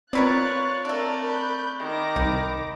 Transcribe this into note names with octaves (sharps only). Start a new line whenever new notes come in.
C4 F4 A#4 B4 C#5 D5 F#6 A6
A3 D4 A#4 D5
B5 F#6 G6
D#3 B5 D6 A#6
C2 D#4